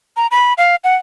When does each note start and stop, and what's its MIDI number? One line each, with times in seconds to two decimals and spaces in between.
0.17 0.27 82
0.31 0.53 83
0.58 0.76 77
0.84 0.96 78